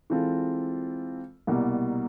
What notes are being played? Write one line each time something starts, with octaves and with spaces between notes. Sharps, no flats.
E3 G#3 C4 F4 A4
C2 B2 G3 A#3